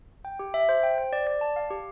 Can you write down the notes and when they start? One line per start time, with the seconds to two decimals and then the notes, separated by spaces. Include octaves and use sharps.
0.25 G5
0.39 G4
0.54 E5
0.69 C5
0.83 G5
0.98 C5
1.13 D5
1.27 D5
1.41 A5
1.56 F5
1.70 G4